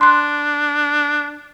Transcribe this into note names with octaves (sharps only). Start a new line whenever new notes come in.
D4 C6 F#6